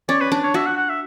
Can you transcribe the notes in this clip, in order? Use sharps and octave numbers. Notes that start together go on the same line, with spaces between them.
C#4 D5
B4
D4
C#5
F#4 E5
F#5
F#5
E5